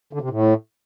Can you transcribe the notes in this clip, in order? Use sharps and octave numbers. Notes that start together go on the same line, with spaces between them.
D3
C3
A2